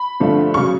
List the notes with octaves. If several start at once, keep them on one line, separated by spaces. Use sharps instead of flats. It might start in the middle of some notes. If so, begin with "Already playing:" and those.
Already playing: B5
G2 D3 F3 A3 C4
C#3 F#3 C#6